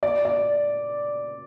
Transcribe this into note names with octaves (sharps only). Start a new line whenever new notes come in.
D5
D5